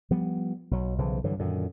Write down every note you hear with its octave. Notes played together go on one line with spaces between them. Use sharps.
F3 G3 B3
B1 F#3
B1 C#3 E3 F3
G2 D3 E3 F#3
F#2 A#2 D3 D#3